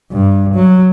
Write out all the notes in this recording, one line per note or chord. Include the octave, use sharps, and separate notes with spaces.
G2
F#3